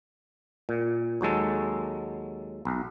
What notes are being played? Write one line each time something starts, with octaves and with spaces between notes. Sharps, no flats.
A#2
D#2 F#3 G#3 A4
B1